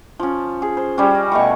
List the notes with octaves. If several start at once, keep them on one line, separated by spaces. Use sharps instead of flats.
F3 C#4
G#4
C5
G3 C#4
D#5
B2 A3 C#6